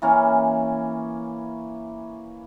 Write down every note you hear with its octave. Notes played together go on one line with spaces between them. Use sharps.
E3 A#3 C#4